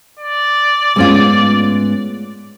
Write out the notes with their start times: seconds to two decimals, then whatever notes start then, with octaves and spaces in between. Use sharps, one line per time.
0.19 D5
0.96 G#2 G#3 A3 B3 C#4 F4